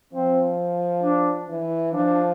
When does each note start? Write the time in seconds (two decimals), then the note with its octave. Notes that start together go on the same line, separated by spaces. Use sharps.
0.13 F3 C4
1.02 D4
1.48 E3
1.93 F3 D4